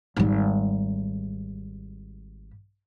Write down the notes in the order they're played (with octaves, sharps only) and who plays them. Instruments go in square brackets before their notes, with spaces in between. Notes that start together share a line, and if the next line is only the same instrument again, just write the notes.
[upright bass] G#1 G3